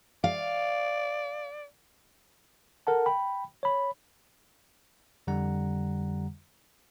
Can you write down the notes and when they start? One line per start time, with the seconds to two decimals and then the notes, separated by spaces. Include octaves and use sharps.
0.24 D5 F5
2.87 A4 A#4 F#5 A5
3.06 G5 B5
3.63 C#5 B5
5.27 F2 D3 G3 F#5 A#5